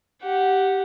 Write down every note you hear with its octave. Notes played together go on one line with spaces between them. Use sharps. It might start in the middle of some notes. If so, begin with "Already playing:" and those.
G4 F#5